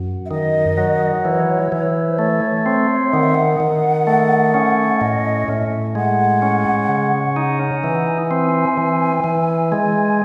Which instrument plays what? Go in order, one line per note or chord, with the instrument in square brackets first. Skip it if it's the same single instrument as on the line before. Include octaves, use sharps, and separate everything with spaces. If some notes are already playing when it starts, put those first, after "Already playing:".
Already playing: [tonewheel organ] F#2
[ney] E5
[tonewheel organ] D#3 [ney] D#5
[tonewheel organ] F#3
[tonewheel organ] E3 [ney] C#5
[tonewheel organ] E3
[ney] C5
[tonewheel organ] A3 [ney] C#5
[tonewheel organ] C4 [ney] C#5
[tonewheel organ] D#3 [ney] F#5
[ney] E5
F#5
[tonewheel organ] D#3
A3
C#4
[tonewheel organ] A2 [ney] D#5
[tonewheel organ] A2 [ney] E5
[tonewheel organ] G#3 [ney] F#5
[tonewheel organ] C#4
C#3
D#4
[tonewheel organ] E3 [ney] G#5
[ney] F#5
G#5
[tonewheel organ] C4
E3
E3
G#3